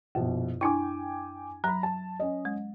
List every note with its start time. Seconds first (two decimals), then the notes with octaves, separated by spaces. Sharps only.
0.15 A#1 F#2 B2
0.61 D4 E4 G5 G#5 D6
1.64 F#3 A#5 B5
1.83 A5
2.20 C#4 D#5
2.45 G#3